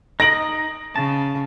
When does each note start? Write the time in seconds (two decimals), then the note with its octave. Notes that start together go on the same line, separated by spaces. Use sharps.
0.20 D#4 D#5 A#6 D7 F#7
0.96 C#3 A5